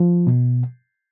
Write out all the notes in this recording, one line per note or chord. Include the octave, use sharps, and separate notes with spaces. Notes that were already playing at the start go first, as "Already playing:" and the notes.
Already playing: F3
B2